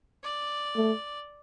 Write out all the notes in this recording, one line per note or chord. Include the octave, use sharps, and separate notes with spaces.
D5
A3